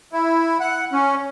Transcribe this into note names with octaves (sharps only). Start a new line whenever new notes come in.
E4
F#5
C#4